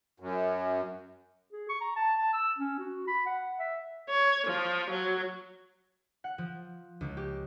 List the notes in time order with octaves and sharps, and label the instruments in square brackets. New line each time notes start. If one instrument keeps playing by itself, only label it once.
[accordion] F#2
[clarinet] G#4
C#6
A#5
A5
A5
E6
C#4
F#4
B5
F#5
E5
[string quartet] C#5
F3
F#3
[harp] F#5
F3
C#2
G4